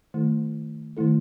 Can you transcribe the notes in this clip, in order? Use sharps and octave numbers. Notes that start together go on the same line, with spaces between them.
D#3 A3 E4 A4
D#3 A3 E4 A4